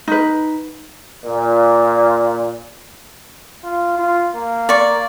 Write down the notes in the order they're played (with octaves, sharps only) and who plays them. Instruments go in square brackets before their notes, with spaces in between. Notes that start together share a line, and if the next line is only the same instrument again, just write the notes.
[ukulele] D#4 B4
[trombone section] A#2
[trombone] F4
F4
A#3
[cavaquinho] D5 C#6